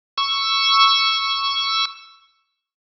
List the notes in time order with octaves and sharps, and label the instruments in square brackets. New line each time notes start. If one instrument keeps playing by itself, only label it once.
[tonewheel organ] C#6 E6